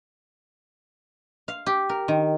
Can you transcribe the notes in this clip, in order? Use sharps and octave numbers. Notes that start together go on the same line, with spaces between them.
F5
G4
A#4
D#3